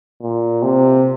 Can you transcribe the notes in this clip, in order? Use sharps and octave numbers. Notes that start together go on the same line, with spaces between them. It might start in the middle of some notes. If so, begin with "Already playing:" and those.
A#2
C3